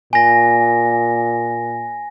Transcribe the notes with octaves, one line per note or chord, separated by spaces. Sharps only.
A#2 G#5 A#6